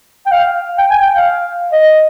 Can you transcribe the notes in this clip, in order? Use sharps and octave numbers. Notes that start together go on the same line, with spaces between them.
G5
F5
G5
G#5
G5
F5
D#5